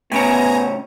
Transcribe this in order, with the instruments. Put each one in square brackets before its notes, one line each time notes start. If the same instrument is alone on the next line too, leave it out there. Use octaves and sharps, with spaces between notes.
[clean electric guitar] A2 C#3 C#4 [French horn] B3 [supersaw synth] G#5 A#5